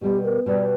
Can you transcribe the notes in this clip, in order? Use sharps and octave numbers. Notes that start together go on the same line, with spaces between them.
B2 G3 B3 G4
A#4
B2 G3 B3 D5